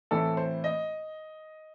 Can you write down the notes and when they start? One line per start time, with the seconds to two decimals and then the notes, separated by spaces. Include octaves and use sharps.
0.11 A2 E3 C4 E4 A4
0.37 C5
0.64 D#5